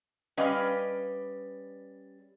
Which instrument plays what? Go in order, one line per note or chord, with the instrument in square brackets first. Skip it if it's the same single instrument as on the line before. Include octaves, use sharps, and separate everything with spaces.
[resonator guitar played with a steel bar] G3 C#4 B4 D5 D#5 F5